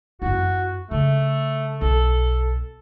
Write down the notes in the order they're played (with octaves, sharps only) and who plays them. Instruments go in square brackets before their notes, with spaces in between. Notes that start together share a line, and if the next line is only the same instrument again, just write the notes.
[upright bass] F#2 E4 [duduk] F#4
[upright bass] C#3 [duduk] A3
[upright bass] B1 [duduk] A4